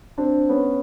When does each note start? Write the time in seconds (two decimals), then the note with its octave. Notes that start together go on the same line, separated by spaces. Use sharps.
0.18 C4 D4
0.49 B3 C#4